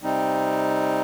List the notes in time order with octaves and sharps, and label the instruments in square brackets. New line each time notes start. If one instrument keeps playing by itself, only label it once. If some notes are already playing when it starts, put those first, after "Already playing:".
[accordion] C3 G3 C4 D#4